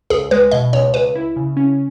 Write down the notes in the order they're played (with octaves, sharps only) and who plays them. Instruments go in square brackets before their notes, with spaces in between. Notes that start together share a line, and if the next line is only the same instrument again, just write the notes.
[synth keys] C#2 [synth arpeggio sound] G#4
[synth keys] G#3 [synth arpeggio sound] B4
[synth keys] B2 [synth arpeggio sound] D#5
[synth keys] C#2 [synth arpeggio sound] C#5
[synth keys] C#2 [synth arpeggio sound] B4
[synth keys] E4
C#3
C#4